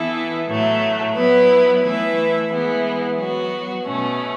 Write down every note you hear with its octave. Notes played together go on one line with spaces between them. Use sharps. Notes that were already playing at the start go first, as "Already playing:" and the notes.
Already playing: E3 B3 E4 A4 E5
A2 F#3 A3
F#3 B3 E4 B4
E3 A3 E4 B4 E5
E3 G#3 B3 E4
F#3 B3 F#4
B2 A3 C#4